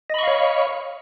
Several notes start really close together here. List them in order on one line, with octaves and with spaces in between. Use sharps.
D#5 B5 C#6 F5 C#5